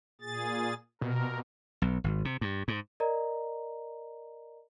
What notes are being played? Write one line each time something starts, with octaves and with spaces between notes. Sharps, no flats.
A#2 G#4 A6
B2 A#4
B1
G#1
C3
G2
G#2
A#4 D5 D#5 A#5